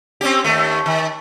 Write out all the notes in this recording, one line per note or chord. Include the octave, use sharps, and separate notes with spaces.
C4 C#4 G4
D#2 A3
D#3